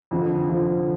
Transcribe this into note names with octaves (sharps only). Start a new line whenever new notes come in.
F2 D3 F3
F2 D3 F3